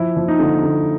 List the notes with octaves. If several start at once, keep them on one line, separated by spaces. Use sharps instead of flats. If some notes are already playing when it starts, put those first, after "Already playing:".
Already playing: F3 E4
F3
D#4
D3
D3